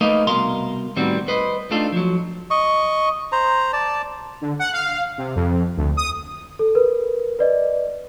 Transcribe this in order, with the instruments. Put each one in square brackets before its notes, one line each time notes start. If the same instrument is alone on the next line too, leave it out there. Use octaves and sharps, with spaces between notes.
[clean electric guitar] A3 A#3 D#4 B4 D#5 F5
C2 B2 A#4 F5 C6
A2 D#3 G3 B3 C4 F#4
B4 C5 D#5
A3 D4 D#4 F4 A4
F3 F#3
[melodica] D#5 C#6
C5 A#5
D5 A5
[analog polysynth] D3
F#5
F5
C3
F2
D2
D#6
[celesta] A4
A#4 B4
B4 D5 D#5